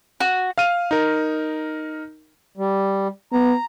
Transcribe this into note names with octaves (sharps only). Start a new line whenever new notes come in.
F#4
F5 F6 D#7
D#4 A#4
G3
B3 A#5